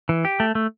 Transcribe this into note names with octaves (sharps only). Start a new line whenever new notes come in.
E3
G4
A3
A3